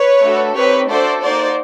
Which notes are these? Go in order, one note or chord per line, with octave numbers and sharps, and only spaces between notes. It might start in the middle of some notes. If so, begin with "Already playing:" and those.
Already playing: B4 C#5
A3 D4 F#4 A4
C4 D#4 G4 B4 C#5
A3 D4 F#4 A4 C5 D5
A#3 D#4 F#4 C5 D5